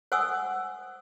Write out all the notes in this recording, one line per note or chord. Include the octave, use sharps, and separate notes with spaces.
C5 F#5 G#5 C#6 D#6 E6